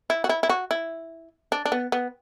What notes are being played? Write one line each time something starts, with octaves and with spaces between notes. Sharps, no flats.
E4
F#4
E4
E4
F#4
E4
D4
D4
B3
B3